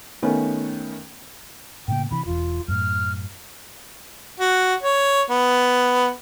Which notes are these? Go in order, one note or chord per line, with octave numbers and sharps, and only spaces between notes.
D#3 A3 B3 C#4
A2 C#3 A#3 G5
C3 E3 B5
E1 E2 F4
F#2 A2 F6
F#4
C#5
B3